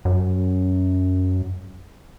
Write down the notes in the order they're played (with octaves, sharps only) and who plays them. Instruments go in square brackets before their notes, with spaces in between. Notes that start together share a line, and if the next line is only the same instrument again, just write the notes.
[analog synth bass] F#2